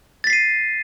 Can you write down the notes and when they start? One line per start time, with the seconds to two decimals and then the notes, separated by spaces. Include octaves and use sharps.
0.24 A6
0.27 B6
0.30 C7
0.33 D#7